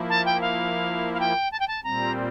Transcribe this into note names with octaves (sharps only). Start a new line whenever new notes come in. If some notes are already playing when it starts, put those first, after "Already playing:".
Already playing: F3 A#3 E4
A5
G5
F5
F5
G5
A5
G5
A5
A#2 G3 C4 A#5